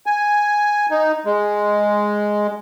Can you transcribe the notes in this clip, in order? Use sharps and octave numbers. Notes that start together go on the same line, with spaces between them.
G#5
D#4
G#3